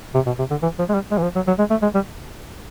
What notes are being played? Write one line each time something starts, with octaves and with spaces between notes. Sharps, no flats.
C3
B2
C3
D3
E3
F3
G#3
G3
G#3
E3
F3
F#3
F#3
G#3
A3
G#3
G3